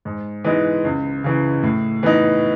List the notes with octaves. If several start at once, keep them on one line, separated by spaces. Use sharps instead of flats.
G#2
E3 G#3 B3 D#4
C#2
C#3 E3
A2
E3 B3 D#4